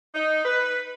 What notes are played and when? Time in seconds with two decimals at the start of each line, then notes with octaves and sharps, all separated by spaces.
0.15 D#4
0.45 B4